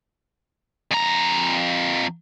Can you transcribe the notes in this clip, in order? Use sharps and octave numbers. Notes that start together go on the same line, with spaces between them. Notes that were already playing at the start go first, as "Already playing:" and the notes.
F2 A#5